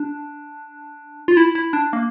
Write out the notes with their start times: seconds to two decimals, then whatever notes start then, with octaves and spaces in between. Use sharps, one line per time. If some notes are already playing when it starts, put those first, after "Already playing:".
Already playing: D4
1.28 F4
1.37 E4
1.55 E4
1.73 D4
1.93 A#3